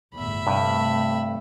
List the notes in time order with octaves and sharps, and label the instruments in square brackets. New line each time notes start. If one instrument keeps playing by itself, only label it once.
[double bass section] G1 E2 A2 [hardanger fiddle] E5 B5
[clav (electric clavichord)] G2 [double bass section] C3 A3